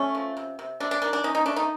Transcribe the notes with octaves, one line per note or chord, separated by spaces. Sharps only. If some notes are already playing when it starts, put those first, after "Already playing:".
Already playing: A3 C#4
F3
C3
C3
C3 D4
D4
D#3 D4
D4
C#4 D#4
D#4
A3 D4
D#4